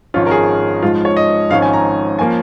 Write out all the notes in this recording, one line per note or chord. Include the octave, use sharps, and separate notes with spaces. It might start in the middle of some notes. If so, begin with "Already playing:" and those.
G#1 G#2 F3 C#4 F4
A#4
G#4
G#2 F3 G#3 C#4 F4
C#5
D#5
G#1 G#2 F3 C#4 F5
G#5
A#5
F3 A#3 C#4 G#5